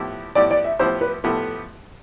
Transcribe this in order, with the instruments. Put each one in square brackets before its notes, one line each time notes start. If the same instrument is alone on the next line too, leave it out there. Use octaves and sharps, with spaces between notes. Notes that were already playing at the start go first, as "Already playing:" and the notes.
Already playing: [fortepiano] A2 F3 B3 E4 G4
[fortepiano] A2 F3 B3 E4 G4 [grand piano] D5
[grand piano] D5
E5
[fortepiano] A2 F3 B3 E4 G4 [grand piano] C5
[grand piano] B4
[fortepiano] A2 F3 B3 E4 G4 [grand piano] A4